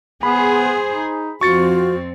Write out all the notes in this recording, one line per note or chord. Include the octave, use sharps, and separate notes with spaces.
B3 G#4 C5 B5
D#4
F2 C4 F4 F#4 C#6 A6 C#7